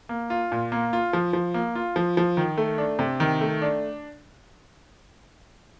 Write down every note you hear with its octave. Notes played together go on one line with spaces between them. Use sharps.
A#3
F4
A#2
A#3
F4
F3
F3
A#3
F4
F3
F3
D#3
A3
D4
C3
D#3
A3
D4